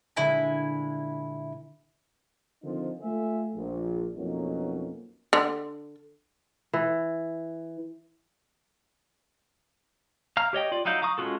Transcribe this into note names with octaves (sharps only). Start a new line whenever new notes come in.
A#2 D3 G#3 E4 G#5
D3 D#3 F3 C4 D#4
A3 F4 E5 G#5
A#1
F2 B2 F#3 A#3 C#4 D#4
D3
E3
F5 A#5 F6
G4 C#5 D#5 G5
F4 D5
F#3 D#4 E4 F5 G6
F5 A#5 C#6 D#6
G#3 C#4 F4 F#4 A4